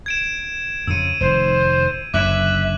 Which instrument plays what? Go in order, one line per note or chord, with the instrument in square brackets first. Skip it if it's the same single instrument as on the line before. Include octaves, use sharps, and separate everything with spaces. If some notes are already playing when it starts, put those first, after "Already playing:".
[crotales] G#6 D7 E7
[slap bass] F2 C#3 [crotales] E6 D#7
[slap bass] F1 D#3 [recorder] C5
[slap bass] F#1 F#2 D3 [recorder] E5 [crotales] D6 F#6 F#7